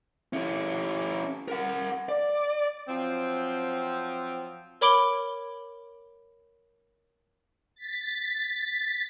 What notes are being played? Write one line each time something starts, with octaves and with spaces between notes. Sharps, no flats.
C#4 E4
A#4 F#5
D5
F3 F#3 C4
A#4 C#5 B5 D6 D7 G7
A6 B6